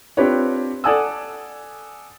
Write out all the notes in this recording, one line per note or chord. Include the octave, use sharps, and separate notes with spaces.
C4 D4 F4 G4 B4 C#5
A4 D5 F#5 G#5 D#6 E6